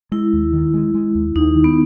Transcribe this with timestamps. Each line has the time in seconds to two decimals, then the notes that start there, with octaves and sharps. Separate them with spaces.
0.12 G#3 E4
0.33 D#2
0.53 D#3
0.74 G#3
0.94 G#3
1.15 D#2
1.35 D#2 D#4
1.55 D#3
1.64 B3